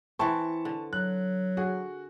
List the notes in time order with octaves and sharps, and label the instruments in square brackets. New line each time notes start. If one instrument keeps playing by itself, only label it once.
[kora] E3 C4 [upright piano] A5 C#6
[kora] D3
[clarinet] F#3 [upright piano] F#6
[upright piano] F#4 [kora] G#4